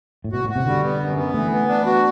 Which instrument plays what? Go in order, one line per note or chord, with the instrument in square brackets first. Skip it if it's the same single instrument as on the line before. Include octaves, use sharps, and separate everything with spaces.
[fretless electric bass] A2
[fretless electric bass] B2 [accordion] F#4
[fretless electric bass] A2
[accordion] F#4
[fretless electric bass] C3
[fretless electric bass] D3 [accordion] G3
[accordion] B3
F#2
B3
[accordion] E3 [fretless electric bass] A3
[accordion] B3
D4
F#4